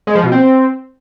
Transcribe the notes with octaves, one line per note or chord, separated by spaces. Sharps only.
G#3
F3
B2
C4